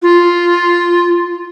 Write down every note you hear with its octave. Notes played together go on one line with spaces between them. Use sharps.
F4